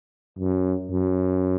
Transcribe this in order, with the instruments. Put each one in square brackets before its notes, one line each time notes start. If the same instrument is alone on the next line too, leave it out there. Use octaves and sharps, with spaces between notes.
[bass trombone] F#2
F#2